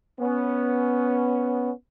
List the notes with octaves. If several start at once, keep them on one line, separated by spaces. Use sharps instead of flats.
B3 C#4